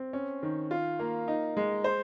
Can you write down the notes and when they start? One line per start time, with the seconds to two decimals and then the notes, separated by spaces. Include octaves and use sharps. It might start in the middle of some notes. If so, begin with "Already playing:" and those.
Already playing: C4
0.13 C#4
0.43 D#3
0.71 F4
0.99 A#3
1.28 D#4
1.57 G#3
1.84 C5